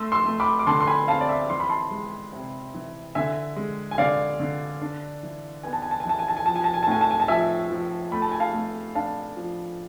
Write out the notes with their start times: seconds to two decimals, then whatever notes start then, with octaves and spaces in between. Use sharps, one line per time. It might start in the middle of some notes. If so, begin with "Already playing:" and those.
Already playing: A3 C6 E6
0.12 C6 E6
0.26 A3
0.40 B5 D6
0.59 D6
0.67 D3 A5 C6
0.81 C6
0.87 G#5 B5
1.08 C4 F5 A5
1.21 D5
1.29 E5
1.50 E3 C6
1.60 B5
1.70 A5 C6
1.91 G#3
2.33 C3
2.74 E3
3.15 D3 E5 G#5
3.56 G#3
3.91 G#5
3.98 D3 D5 F5
4.40 D3
4.81 D4
5.23 E3
5.63 B3 G#5
5.73 A5
5.82 G#5
5.91 A5
6.00 G#5
6.05 E3 A5
6.19 G#5
6.28 A5
6.37 G#5
6.46 F3 A5
6.56 G#5
6.64 A5
6.74 G#5
6.83 A5
6.87 A2 G#5
7.01 A5
7.11 G#5
7.20 A5
7.28 F3 E5 G#5
7.70 F3
8.12 A3 B5
8.22 A5
8.32 G#5
8.40 F5 A5
8.54 A3
8.95 D4 F5 A5
9.36 F3